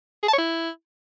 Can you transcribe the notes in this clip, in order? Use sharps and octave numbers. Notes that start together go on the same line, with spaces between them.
G#4
A5
C#5
E4